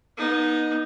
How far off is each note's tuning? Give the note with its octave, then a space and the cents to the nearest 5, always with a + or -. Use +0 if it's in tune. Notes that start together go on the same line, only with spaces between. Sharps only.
B3 -35 D#4 +0